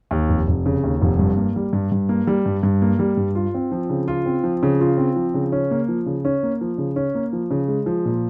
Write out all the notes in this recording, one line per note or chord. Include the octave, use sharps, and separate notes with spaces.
D#2
F1
F1
C#3
D#2
F1
G2
A#3
G3
G2
G2
A#3
G3
G2
G2
A#3
G3
G2
F4
C4
F3
C#3
F4
C4
F3
C#3
F4
C4
F3
C#3
C#4
A#3
F3
C#3
C#4
A#3
F3
C#3
C#4
A#3
F3
C#3
G#3
F3
A#2